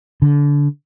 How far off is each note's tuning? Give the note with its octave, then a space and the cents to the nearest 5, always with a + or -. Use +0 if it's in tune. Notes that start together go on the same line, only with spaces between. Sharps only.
D3 -25